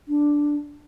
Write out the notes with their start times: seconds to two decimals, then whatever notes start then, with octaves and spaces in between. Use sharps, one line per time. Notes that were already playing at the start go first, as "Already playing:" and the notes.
0.08 D4